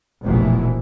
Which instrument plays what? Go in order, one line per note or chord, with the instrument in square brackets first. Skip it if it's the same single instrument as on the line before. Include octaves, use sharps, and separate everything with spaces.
[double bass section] F1 A#1 B2 E3